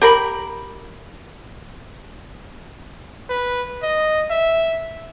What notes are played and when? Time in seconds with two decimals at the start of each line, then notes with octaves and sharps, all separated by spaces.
0.02 G4 A#4 B5
3.29 B4
3.83 D#5
4.30 E5